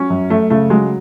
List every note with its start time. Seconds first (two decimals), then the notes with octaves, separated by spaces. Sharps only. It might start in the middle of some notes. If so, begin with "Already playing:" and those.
Already playing: F#3 C#4
0.10 F#2
0.30 F#2 A3
0.50 C#3 A3
0.70 F#3 G#3